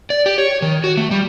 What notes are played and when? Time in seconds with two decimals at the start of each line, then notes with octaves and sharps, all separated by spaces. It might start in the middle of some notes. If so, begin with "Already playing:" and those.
0.10 D5
0.26 G4
0.38 C#5
0.62 D#3
0.84 F#4
0.97 A3
1.11 G3